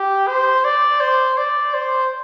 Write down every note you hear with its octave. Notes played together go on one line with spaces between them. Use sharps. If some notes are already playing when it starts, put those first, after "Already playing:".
Already playing: G4
C5
D5
C5
D5
C5